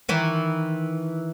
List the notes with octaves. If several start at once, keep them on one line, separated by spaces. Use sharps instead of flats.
D#3 E3 E4